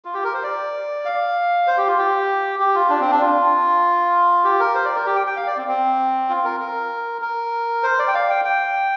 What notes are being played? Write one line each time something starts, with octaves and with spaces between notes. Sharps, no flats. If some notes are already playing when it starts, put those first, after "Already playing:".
F4
G4
A#4
C5
D5
F5
C5
G4
F4
G4
G4
F4
D4
C4
D4
F4
G4
A#4
C5
D5
A#4
G4
G5
G5
F5
D5
C4
C4
F4
A#4
A#4
A#4
C5
D5
G5
F5
G5
G5